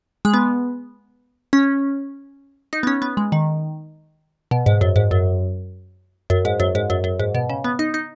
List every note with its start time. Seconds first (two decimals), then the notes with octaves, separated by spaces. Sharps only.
0.25 G#3
0.34 B3
1.53 C#4
2.73 D#4
2.83 B3
2.87 C#4
3.02 B3
3.17 G#3
3.32 D#3
4.51 B2
4.66 G#2
4.81 F#2
4.96 G#2
5.11 F#2
6.30 F#2
6.45 G#2
6.60 F#2
6.75 G#2
6.90 F#2
7.04 F#2
7.20 G#2
7.35 B2
7.49 C#3
7.64 B3
7.79 D#4
7.94 D#4